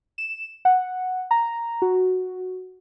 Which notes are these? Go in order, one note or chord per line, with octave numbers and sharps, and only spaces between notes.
E7
F#5
A#5
F#4